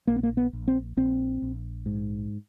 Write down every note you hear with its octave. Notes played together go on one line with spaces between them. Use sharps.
A#1 A#3
B3
A#3
B3
A#1
C4
A#1 C4
A#1
G#2